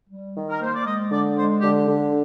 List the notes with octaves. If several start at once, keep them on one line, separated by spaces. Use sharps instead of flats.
G3
D#3
A#4
A#3 C5
D5
G#3 D#5
D3 D5
G#3 C5
D3 G4
D3